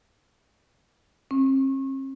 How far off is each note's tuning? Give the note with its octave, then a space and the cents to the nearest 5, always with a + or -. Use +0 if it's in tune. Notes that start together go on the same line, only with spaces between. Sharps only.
C4 +45